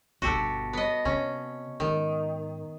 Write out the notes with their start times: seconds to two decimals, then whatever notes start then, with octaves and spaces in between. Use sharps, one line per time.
0.22 G1 B2 F#4 G4 A4
0.73 B3 D#5
1.05 C3 C#4
1.80 G#2 D#3